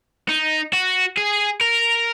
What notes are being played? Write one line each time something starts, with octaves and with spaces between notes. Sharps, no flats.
D#4
F#4
G#4
A#4